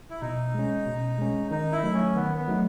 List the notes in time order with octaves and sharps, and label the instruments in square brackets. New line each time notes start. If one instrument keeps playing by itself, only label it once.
[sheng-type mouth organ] E4
[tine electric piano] B2 [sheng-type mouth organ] D#4
[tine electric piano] G#3 C#4
B2
G#3 C#4
[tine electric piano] D#3 [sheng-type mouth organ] D#4
[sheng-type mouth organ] E4
[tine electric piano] F#3 A3 D#4
[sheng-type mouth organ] C#4
[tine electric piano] D#3 [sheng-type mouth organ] B3
[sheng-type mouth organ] B3
[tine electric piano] F#3 A3 D#4